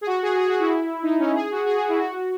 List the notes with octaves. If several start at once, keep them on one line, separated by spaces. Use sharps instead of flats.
G#4
F#4
G#4
G#4
F#4
E4
D#4
C#4
G#4
F#4
G#4
F#4
E4
F#4